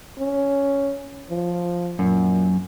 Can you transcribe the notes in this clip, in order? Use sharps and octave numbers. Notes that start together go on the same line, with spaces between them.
C#4
F3
F#2 A#2